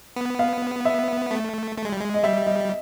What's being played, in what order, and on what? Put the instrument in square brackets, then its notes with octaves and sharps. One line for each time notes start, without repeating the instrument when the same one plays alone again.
[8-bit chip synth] B3
[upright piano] F5
E5
[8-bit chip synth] A3
A3
G#3
G3
G#3
[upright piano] D#5
[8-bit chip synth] G3 [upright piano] E5
[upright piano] D#5